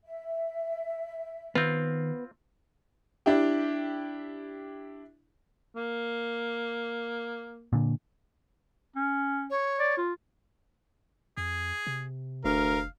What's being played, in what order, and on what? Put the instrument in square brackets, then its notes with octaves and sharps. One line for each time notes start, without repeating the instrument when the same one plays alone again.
[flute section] E5
[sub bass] D#3 [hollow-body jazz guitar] B3 [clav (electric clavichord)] C4 F4
[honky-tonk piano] D4 E4 G4
[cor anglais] A#3
[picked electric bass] A#2 D3
[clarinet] C#4
[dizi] C#5
[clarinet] D5
F4
[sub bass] F2 [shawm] G#4
[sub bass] C3
[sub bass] F1 [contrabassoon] D2 [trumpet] A#4 [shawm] F5